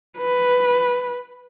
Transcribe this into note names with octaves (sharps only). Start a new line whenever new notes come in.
B4